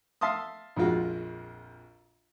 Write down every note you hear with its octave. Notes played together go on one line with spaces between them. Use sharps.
E5 F5 A5 C6 D#6
A#1 F2 G#3 F4 F#4